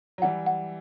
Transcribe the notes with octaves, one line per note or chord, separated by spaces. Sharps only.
F#3
E3 G3 F#5
F#5